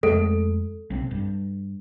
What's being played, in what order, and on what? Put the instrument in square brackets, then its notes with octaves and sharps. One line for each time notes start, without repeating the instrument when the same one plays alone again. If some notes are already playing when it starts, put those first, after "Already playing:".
[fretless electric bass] F2 G#3 A3 [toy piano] A4
[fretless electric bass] B1 C4
G2